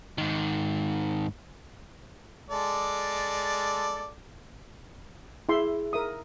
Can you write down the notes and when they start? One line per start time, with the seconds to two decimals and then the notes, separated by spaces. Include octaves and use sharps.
0.18 G#2 D#3
2.50 G#3 A4 D5
5.49 E4 G#4 E5 C6
5.93 A#4 E5 D#6